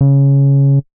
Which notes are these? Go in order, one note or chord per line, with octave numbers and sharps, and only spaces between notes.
C#3